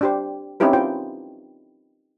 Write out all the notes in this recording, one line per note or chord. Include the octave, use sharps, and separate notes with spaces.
D4 G4 C5
C4 C#4 D#4 E4 G4 B4
F4 C5 G5